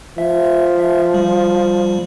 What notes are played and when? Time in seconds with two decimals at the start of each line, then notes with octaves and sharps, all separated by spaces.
0.18 F3 E5
0.79 E5
1.14 G3